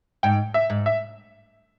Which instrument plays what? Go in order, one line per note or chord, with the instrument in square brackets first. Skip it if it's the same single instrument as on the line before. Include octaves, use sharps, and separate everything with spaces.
[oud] G#2 [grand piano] G5
[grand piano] E5
[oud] G#2
[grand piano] E5